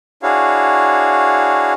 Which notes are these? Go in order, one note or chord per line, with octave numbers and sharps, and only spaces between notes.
D4 E4 F#4 G#4 C#5 F5